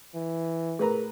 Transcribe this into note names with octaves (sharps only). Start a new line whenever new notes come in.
E3
A2 G#4 A#4 B4 A#5